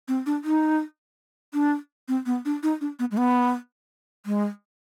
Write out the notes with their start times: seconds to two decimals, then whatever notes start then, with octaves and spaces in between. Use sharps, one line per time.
0.08 C4
0.26 D4
0.44 D#4
1.54 D4
2.08 C4
2.26 B3
2.45 D4
2.63 D#4
2.81 D4
2.99 B3
3.11 G#3
3.17 B3
4.26 G#3